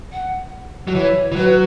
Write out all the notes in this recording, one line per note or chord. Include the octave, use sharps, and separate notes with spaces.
F#5
F#3
E3 C#5
E3
F#3 B4